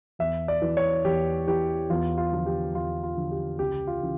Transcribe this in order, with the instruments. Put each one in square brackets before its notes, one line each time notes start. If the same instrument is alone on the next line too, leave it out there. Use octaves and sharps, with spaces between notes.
[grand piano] E2 E5
D5
E3
C#5
E2 G4
E3 G4
E2 F4
F4
D3 F3
G4
E2 F4
F4
D3 F3
G4
C#2 G4
F4
C#3 E3